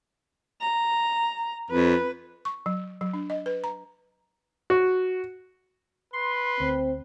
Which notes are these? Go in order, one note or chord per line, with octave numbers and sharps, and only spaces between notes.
A#5
F2 B4
C#6
F#3
F#3
D4
D#5
B4
A#5
F#4
B4 C6
D2 C4